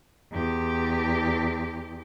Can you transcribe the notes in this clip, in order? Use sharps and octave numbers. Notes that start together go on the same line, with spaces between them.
E2 G4